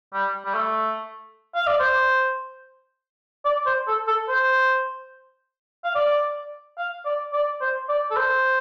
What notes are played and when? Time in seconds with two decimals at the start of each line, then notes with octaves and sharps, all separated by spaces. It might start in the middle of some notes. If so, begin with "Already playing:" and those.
0.13 G3
0.45 G3
0.54 A3
1.55 F5
1.67 D5
1.80 C5
3.45 D5
3.66 C5
3.87 A4
4.07 A4
4.29 C5
5.84 F5
5.95 D5
6.78 F5
7.05 D5
7.33 D5
7.61 C5
7.89 D5
8.11 A4
8.16 C5